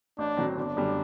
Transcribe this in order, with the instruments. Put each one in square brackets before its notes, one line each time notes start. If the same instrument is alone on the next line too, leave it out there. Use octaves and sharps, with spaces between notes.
[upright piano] A1 [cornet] D4
[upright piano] A2 F#3 C4
[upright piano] G1 [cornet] D4
[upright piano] F#2 D3 G3